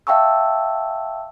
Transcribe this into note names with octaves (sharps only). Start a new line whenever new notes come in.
E5 F5 G5 A5 C#6 E6